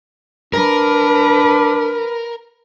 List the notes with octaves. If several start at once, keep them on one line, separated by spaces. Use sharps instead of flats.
D4 A#4 B4